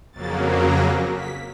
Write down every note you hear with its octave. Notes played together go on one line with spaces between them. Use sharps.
F2 C#3 F#3 A#3 A6
A#6
B6